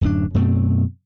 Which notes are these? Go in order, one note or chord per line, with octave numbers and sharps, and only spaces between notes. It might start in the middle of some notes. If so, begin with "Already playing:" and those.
D1 F#2 F#3 D4
F#2 B2 A3 C4